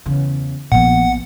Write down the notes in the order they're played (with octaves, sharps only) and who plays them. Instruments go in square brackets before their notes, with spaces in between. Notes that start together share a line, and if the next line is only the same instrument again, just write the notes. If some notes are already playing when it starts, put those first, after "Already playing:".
[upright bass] E2 C#3
[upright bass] A#1 B3 [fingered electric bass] A#2 F3 [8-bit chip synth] F#5